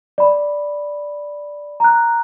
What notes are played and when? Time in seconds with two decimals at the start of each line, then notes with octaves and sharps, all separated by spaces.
0.18 D5 B5
1.80 A#5 F#6